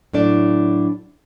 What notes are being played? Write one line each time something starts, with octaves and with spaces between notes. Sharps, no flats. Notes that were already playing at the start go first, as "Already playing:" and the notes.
A2 F#3 A3 D4 D5